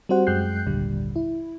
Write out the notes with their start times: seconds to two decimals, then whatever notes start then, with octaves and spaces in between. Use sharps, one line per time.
0.09 G3 C4 F#4 C5 F#5
0.27 F#2 G#3 G5 F#6 G6 C7
0.66 G#1 D#2 A#2 D3 G3
1.16 E4